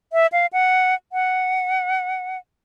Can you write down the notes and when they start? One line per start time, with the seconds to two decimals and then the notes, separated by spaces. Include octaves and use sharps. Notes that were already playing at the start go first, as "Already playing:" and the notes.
0.13 E5
0.32 F5
0.53 F#5
1.12 F#5